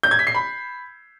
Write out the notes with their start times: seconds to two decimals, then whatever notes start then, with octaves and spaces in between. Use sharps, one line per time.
0.03 G6
0.11 G#6
0.19 B6
0.27 C7
0.35 B5